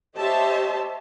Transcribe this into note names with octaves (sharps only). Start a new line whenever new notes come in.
G4 C5 C#5 D#5 E5 A5